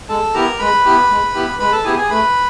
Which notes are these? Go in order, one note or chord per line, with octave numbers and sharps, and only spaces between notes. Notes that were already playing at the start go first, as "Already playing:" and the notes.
G#3 A4 A5
B3 E4 G4 A#4 A#5
G#3 B4 B5
B3 E4 G4
G#3
B3 E4 G4
G#3 B4 B5
A4 A5
B3 E4 G4 G#4 G#5
G#4 G#5
A3 B4 B5